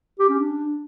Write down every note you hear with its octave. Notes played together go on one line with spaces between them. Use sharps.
G4
C#4
D4